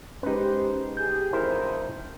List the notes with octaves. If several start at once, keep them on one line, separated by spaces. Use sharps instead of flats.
G#3 C#4 D#4 G4 B4 C5
G4 G#4 G6
A1 F2 D#3 E4 A#4 C5